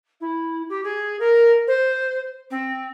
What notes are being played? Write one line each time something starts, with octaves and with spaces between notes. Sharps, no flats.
E4
G4
G#4
A#4
C5
C4